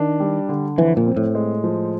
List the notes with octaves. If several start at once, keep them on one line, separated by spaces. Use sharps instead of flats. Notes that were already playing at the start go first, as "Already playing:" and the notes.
Already playing: D#3 D4
G3
D3
F2 E3
A#2
C4
A2
G#3
F3